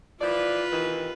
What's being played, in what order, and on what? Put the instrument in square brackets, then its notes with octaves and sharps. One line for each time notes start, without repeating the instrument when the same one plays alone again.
[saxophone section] E3 F3 D5 [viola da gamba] F4 B4
[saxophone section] C3 D#3 E3